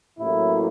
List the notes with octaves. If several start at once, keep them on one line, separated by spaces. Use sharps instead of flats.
A1 A2 F#3 A#3 E4